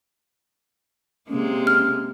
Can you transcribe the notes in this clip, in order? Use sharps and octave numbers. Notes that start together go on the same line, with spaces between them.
C3 G#3 A#3 C#4
F6